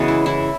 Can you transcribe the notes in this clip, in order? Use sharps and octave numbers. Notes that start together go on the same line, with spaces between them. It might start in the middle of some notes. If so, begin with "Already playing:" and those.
Already playing: C#3 E3 G#3 B3 C#4 F#4
E4
E4